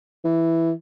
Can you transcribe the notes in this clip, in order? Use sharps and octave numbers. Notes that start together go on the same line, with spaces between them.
E3